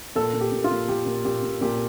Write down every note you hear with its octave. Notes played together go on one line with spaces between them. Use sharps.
A#2 A4
A#2
G4
A#2
F4
A#2
A#2 G4
A#2
A#2 G4
A#2
A#2 G4